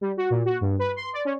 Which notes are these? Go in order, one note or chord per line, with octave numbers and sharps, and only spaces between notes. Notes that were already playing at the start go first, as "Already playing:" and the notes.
G3
F#4
A#2
F#4
G2
B4
C6
D5
C#4